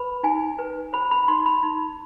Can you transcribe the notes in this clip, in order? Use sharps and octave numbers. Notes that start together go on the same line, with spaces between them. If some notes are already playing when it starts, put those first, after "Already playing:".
Already playing: B4 B5
D#4 G#5
B4
C5 B5
B5
D#4 C6
B5
D#4